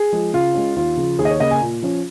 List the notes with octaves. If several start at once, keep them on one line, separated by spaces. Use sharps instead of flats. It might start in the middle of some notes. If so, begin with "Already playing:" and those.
Already playing: G#4
F3 G#3
C#3 F4
G#3 C#4
D#2 F4
C#3 F3
D#2 G#4
D#5
C#5
C#3 A#3 D#5
G#5
A#2
F3 C#4